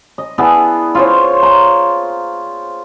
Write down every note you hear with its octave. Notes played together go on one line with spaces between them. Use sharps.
D#5
B3 D4 E4 G#4
F4 C5 C#5
A#5